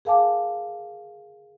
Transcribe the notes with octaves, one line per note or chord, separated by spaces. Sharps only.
G#4 A#4 F5 G#5 A5 D6